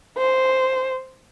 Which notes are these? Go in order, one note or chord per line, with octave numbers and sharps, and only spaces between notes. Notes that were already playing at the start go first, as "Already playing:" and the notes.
C5